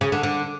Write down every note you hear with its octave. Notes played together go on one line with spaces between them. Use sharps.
C#3
D3
D3